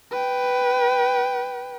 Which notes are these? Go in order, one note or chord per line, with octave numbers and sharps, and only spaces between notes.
B4 G5